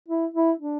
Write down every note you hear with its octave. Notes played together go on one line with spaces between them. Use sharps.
E4
E4
D4